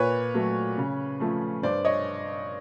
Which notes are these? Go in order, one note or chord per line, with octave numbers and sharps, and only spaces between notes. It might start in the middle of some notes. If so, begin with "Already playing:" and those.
Already playing: A#2 B4 C#5
F#3 A3
C#3
F3 A3
G2 C5 D5
C#5 D#5